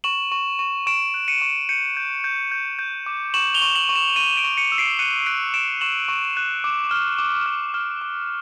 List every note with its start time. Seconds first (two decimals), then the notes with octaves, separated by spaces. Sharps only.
0.04 C#6 E7 F#7
0.32 C#6
0.59 C#6
0.87 C#6 D7 E7
1.14 F#6
1.28 C#7 D#7
1.42 C#6
1.69 G6 C#7 D#7
1.97 G6
2.24 G6
2.52 G6
2.79 G6
3.06 D6
3.34 C#6 E7 F#7
3.54 F7 G7
3.62 C#6
3.75 E7 F#7
3.89 C#6
3.95 E7 F#7
4.16 C#6 D#7 F7
4.37 D7 E7
4.44 C#6
4.57 C#7 D#7
4.72 E6
4.78 C7 D7
4.99 F#6 C#7 D#7
5.26 F#6 C7 D7
5.54 C#6 D7 E7
5.81 C#6 E7 F#7
6.08 C#6
6.37 F#6
6.64 D6
6.91 F6
7.19 D6
7.46 F6
7.74 F6
8.01 D6